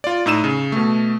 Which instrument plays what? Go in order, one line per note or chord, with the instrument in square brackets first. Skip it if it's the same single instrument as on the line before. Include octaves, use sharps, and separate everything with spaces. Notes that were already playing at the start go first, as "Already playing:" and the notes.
[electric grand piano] F4 D5
A2 D#4 E6 D#7 E7
C#3
B2 A3